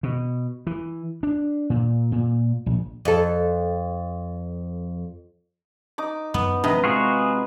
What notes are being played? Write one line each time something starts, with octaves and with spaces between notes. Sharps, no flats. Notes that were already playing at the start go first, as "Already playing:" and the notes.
B2
E3
D4
A#2
A#2
A#1
F2 A4
D#4 D6
F#2 B3
A2 C3 F3 D4 B4 D#5 A#5
G#3 C4 F4 F#4 G#4